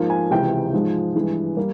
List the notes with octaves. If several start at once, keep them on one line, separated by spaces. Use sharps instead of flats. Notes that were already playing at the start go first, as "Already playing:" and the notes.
Already playing: G#2 F3 A#3
G#5
C#2 C3 E3 G5
G#2 F3 G#3
G2 E3 G#3
G3 A#3